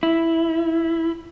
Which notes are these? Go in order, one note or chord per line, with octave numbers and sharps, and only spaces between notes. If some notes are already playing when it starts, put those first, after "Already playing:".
E4